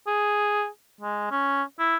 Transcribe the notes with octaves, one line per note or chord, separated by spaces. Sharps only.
G#4
G#3
C#4
E4